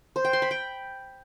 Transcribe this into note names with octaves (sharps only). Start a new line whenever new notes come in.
C5
G5
C6
B5
G5